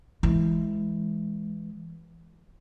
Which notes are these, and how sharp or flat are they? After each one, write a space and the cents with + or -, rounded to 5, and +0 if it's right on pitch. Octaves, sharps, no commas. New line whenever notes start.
E3 +0 G#3 +0